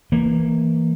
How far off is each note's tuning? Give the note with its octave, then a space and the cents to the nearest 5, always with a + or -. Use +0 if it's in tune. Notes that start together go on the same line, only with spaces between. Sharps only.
E3 +0 A#3 -10